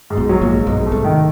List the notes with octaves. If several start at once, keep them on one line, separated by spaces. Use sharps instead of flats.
G#2
B1 B2
F#3
A#1 A#2
G#2
B1 G#2 B2
A3
C2 C3
D#3